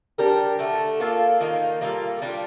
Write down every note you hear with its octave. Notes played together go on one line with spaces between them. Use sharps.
G3 D4 G4 A#4
D3 A3 D4
A#3 F4 A4 D5
D#3 A#3 D#4
G3 A#3 F4 A4
G3 D4 F4